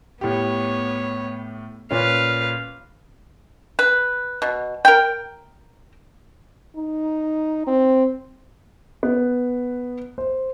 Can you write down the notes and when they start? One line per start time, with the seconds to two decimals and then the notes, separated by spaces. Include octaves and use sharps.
0.21 A2 B3 G4 C#5
1.91 A#2 C#4 B4 F5
3.79 B4
4.42 B2
4.85 A#4 G5
6.76 D#4
7.67 C4
9.03 B3
10.18 C5